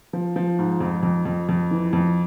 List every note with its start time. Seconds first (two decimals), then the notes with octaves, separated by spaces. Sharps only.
0.13 F3
0.36 F3
0.59 G#2
0.80 F2
1.03 F2
1.25 F2
1.49 F2
1.71 E3
1.93 F2